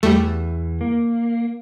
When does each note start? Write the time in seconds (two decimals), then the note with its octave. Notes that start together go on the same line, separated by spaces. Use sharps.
0.03 E2 E3 G3 A3
0.81 A#3